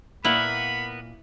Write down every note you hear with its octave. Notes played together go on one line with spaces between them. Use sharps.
A#2 A#3 B3 E4 A#4 D5 F#5 B5